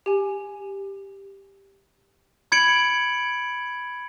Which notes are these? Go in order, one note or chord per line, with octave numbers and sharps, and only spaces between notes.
G4 G#5
B5 G#6 C#7 D7 F#7